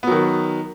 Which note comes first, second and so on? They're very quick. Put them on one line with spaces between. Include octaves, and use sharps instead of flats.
B3 F#3 D#3